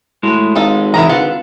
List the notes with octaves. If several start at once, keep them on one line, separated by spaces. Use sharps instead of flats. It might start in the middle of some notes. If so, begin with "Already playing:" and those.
A2 G#3 F#4
G#1 D#4 F4 A4
C2 E3 D#4 E4 A#4 A#5
D3 F4 B4 F#5